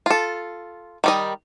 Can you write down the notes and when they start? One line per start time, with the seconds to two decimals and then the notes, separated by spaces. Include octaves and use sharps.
0.06 F4 A4
1.04 D#3 G3 D#5